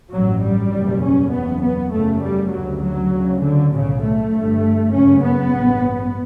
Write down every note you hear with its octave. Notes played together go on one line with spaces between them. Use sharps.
A1 G2 F#3
G3
F#1 E2 B2
C#4
F#1 E2 C#3 B3
B3
F#1 F#2 C#3 A3
G3
D2 C#3 F#3
F#3
D2 C#3
D3
B1 A2 C#3
A3
G1 G2
F#1 F#2 C#3 C#4
B3
A1 G2